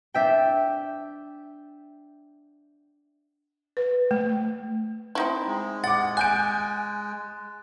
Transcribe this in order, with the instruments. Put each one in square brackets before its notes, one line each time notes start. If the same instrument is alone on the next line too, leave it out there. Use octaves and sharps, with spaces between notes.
[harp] D4 E5 G5
[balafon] B4
A3
[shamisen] C4 D#4 E4
[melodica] G#3
[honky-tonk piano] F#5 D6 [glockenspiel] A6
[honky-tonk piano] G#5 G6 D7 [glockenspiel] F#6